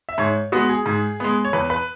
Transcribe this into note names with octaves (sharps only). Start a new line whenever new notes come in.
E5
G#2 C#5
G#3 B3 F#4
G#4
G#2
G#3 B3
C#5
E2 B4
B4